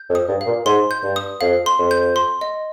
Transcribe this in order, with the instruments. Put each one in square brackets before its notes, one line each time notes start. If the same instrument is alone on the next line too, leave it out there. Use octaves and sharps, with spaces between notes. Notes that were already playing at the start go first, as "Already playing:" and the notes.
Already playing: [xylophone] G6
[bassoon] F2
[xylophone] D#6
[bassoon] G2
[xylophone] F5
[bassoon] A#2
[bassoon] G#2 [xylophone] C6
[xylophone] G6
[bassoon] G2
[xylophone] D#6
[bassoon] F2 [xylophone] F5
[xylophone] C6
[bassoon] F2
[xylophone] G6
C6
D#5